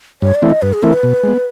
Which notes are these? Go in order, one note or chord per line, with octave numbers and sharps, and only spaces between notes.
G2 C#5
D5
E3 A3 C4 E4
D#5
G2 B4
G#4
E3 A3 C4 E4 A#4
B4
B2
G#3 B3